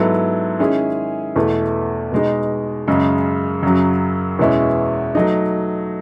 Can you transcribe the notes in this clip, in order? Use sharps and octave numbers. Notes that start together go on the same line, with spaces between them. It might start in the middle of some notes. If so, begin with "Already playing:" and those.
Already playing: G#2 F#3 B3 E4 A4
D#3 G#3 C#4 E4 G#4
E2 B2 A3 E4
B2 G#3 D#4
F#2 C#3 G#3
F#2 C#3 F#3
E2 B2 G#3 C#4 E4
F#3 A3 D#4